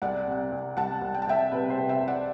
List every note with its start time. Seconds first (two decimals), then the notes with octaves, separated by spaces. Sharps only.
0.02 C2 D5 F#5
0.27 C3
0.52 C2
0.77 C2 F#5 A5
1.01 C2
1.14 G5
1.22 A5
1.27 C2 E5 G5
1.51 C3 B4
1.70 C5
1.77 C3
1.89 E5 G5
2.01 C2
2.08 D5 F#5